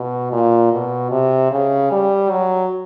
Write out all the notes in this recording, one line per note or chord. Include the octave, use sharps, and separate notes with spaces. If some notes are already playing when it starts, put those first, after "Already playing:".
Already playing: B2
A#2
B2
C3
C#3
G3
F#3